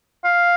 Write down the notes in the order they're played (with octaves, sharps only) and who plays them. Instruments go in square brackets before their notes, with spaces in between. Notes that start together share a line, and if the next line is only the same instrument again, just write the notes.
[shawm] F5